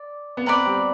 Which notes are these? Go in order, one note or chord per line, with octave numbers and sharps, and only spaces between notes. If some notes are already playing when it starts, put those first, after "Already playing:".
Already playing: D5
B3
C4 B4 D5 F#5 A#5
G3